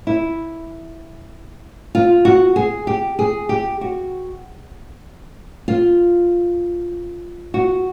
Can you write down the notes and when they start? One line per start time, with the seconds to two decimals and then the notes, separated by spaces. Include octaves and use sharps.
0.07 E4
1.95 F4
2.25 F#4
2.56 G#4
2.87 G4
3.19 G#4
3.49 G4
3.81 F#4
5.68 F4
7.54 F#4